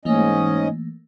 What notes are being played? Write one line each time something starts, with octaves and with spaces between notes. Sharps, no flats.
G#2 E3 A3 A#3 C#4 D#5